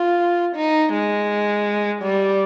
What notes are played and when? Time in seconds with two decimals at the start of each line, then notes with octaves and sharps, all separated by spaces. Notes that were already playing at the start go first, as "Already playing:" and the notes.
Already playing: F4
0.56 D#4
0.93 G#3
2.02 G3